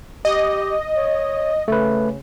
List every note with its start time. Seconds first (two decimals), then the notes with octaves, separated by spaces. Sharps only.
0.25 G4 D#5
0.96 C#5
1.68 C#3 A3 B4